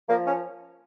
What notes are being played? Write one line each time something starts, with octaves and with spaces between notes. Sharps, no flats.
F3 A#3
C#4